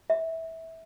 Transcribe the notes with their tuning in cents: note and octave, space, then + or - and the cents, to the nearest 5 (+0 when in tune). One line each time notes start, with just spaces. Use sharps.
E5 -20